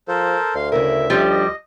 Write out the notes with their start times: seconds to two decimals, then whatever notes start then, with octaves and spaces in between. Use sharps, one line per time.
0.08 F3 A4 A#4 C5
0.55 D2 F5 C6
0.72 C#3 E4 A#4 E5
1.10 F3 G3 C#4 D4 G4
1.30 D#5